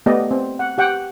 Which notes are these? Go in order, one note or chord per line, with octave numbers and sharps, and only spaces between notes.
A3 B3 G4 D5 D#5
C4
F#5
G4 F#5 G5